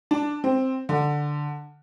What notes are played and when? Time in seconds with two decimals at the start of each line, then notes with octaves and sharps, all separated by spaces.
0.11 D4
0.44 C4
0.89 D3